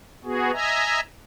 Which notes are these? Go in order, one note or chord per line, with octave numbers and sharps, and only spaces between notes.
B3 F#4 G#4
D#5 E5 G#5 A#5